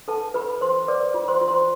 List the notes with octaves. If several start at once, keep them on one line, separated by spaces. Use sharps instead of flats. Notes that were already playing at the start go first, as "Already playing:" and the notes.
A4 B4 A5
F4 B4 B5
B4 C5 C6
B4 D5 D6
F4
C5 C6
F4
C5 C6